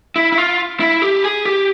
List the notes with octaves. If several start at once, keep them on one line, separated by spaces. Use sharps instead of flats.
E4
E4
F4
E4
G4
G#4
G4